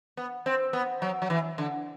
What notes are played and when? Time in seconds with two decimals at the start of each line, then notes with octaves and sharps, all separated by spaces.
0.17 B3
0.46 C4
0.73 B3
1.02 F#3
1.22 F#3
1.30 E3
1.58 D3